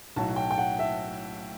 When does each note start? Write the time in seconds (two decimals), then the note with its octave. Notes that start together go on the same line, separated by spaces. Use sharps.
0.16 B1 A2 F#3 A5
0.36 G5
0.51 G5
0.58 F#5
0.79 E5